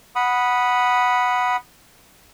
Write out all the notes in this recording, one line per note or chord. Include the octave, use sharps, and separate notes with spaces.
F#5 B5 D#6